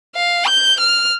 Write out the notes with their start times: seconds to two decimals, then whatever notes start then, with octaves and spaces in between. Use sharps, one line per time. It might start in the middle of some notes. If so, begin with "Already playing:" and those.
0.16 F5
0.47 G6
0.80 F6